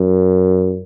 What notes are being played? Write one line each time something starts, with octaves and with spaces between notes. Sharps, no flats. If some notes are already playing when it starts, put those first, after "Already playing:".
Already playing: F#2